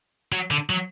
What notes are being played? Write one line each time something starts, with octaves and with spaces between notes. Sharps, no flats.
F#3
D3
F#3